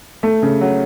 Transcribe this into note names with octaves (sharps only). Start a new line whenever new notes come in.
A3
C#3
F#3